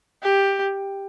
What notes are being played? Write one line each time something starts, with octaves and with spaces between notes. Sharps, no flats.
G4